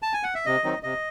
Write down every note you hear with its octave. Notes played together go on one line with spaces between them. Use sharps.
A5
G#5
F#5
E5
C3 D#5
D#3 F#3 C4 D#4
C3 D#5